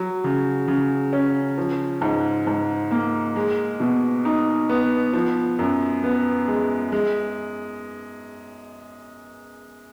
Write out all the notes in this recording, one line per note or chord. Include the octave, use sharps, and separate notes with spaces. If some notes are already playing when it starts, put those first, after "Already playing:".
Already playing: F#3
C#3
C#3
C#4
F3
G#2
G#2
A#3
G#3
B2
D#4
B3
F3
F#2
B3
G#3
G#3